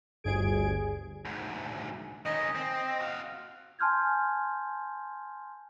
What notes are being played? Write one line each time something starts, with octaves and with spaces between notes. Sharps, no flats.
G1 D2 G2 G#4 G#6 D7
D2 G#2
D#3 C#4 D#5
C4
F#4 F5
G#5 A5 C6 F6 G6 G#6